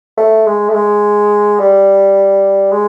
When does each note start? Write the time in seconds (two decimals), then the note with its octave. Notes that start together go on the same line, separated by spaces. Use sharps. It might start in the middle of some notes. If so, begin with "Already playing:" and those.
0.18 A3
0.47 G#3
0.69 A3
0.75 G#3
1.59 G3
2.72 G#3